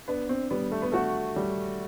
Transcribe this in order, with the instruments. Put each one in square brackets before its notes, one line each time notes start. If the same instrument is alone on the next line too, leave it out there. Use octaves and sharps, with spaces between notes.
[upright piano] B3 [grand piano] D4
[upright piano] C4
[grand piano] G3 [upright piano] B3
[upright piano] A3
B3
[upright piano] A3 [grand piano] F#4
[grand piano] G3